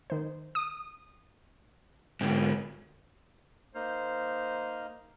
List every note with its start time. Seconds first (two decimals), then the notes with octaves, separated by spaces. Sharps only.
0.10 D#3 C5
0.55 D#6
2.21 G#2 D3 G5
3.75 A#3 D#4 C5 F6